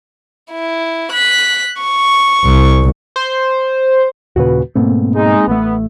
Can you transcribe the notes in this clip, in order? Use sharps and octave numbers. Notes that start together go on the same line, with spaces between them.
E4
F#6 B6
C#6
C2
C5
D#2 A#2 C#3 F#4 B4
G#2 B2 A3 A#3 C4
G#3 D#4
A1 A3 B3